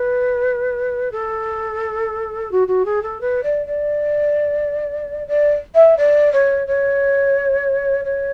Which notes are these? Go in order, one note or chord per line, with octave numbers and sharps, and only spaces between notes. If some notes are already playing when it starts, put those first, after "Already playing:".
Already playing: B4
A4
F#4
F#4
G#4
A4
B4
D5
D5
D5
E5
D5
C#5
C#5
C#5